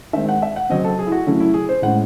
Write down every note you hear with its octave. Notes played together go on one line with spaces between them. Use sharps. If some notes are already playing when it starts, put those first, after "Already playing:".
D#3 G#3 C4 E5
F#5
E5
F#5
C#3 F#3 C4 D#5
A4
G#4
E4
F#4
C#3 F#3 A3 C#4 E4
E4
G#4
C5
A2 G#3 C#4 F#5